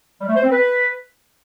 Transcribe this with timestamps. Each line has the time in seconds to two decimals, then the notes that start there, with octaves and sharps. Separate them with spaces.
0.21 G3
0.29 A3
0.36 C5
0.44 C4
0.51 B4